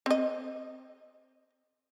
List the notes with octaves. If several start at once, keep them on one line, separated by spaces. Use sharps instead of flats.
C4 D#5